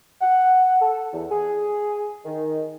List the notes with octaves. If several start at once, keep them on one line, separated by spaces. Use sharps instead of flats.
F#5
A4
E2
G#4
D#3